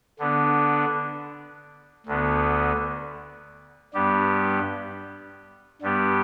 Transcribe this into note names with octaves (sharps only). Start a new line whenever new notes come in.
D3 B3 D4
D2 D3 B3
G2 G3 B3 G4
G2 G3 B3 G4